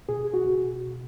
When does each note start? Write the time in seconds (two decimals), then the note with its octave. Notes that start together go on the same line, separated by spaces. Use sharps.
0.09 B2 G#4
0.34 F#4
0.45 B2